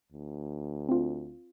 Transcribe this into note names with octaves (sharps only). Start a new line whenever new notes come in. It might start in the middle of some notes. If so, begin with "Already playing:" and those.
D2
C4 F4